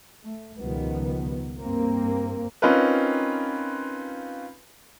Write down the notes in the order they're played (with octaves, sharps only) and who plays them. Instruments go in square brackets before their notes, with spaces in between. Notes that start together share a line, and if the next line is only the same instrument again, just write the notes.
[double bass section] A3
C#2 B2 D#3 F3 G3 B3
G2 A#3 C4
[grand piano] C4 C#4 D#4 F4 A#4 B4